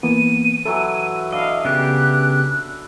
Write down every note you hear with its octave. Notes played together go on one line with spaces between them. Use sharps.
E3 A#3 B3 D#7
E3 F#3 E4 A4
D4 E4 D#5 F5
C#3 B3 G4 A5 F#6